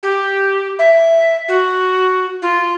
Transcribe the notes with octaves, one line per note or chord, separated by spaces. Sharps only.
G4
E5
F#4
F4